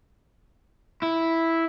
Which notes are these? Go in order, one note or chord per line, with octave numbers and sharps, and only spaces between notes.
E4